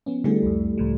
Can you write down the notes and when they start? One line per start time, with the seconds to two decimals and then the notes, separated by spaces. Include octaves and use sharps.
0.06 F3 B3 C#4
0.24 D3 G3 A3 B3 E4 G#4
0.43 C2 F2
0.78 C#2 A2 F3